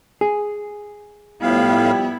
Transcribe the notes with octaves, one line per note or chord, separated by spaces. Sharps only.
G#4
A2 F3 G3 B3 E4 F5